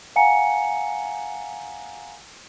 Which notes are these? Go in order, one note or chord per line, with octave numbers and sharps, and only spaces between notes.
F5 F#5 G#5 A#5 C#7